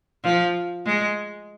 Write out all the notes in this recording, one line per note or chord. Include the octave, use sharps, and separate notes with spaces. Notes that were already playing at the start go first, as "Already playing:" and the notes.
F3
G#3